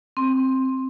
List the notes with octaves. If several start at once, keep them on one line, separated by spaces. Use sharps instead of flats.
C4